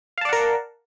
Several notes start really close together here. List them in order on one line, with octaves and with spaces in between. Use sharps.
F5 A5 D5 F#5 A#4